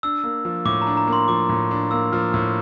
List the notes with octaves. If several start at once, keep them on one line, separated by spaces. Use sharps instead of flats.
D4 E6
A#3
F3
A2 D6
A#5
D4
A#5
A#3
C6
F3 D6
A2
D4
A#3 E6
F3 F6
A2 E6